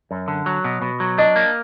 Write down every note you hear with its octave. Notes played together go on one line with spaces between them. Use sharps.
F#2
D3
F#3
B2
B2
F#3
D4 D#5
A#3